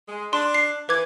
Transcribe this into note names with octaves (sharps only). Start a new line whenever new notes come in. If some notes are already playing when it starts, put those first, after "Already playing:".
G#3
D4 C6
C7
E3 B4 D6 G#6